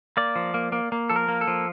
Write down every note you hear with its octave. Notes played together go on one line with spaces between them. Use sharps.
A#3 D5
F3
A#3
A#3
A#3
F3 A4
A#4
A#3
A4
F3